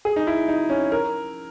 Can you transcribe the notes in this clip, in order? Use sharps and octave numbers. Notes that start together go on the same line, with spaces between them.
G#4
D#4
E4
D#4
C#4
A#4